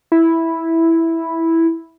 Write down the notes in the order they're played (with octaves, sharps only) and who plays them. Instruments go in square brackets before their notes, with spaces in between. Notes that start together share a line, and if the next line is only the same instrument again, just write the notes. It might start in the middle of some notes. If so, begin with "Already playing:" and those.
[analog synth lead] E4